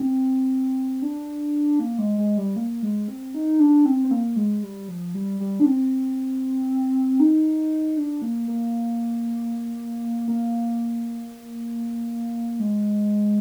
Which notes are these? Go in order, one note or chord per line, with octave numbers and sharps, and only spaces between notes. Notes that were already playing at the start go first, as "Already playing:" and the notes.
Already playing: C4
D4
A#3
G#3
G#3
G3
A#3
G#3
C4
D#4
D4
C4
C4
A#3
G#3
G3
F3
G3
G3
D4
C4
D#4
D4
A#3
A#3
A#3
G#3